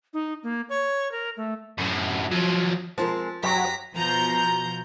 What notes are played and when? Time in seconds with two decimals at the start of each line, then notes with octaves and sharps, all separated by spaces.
0.13 D#4
0.43 A#3
0.69 C#5
1.12 A#4
1.37 A3
1.78 F#2 A2
2.31 F3 F#3
2.98 F3 G#3 C4 A#4
3.43 F#2 F#3 G4 A#5 B6
3.95 B2 F3 A#5 G6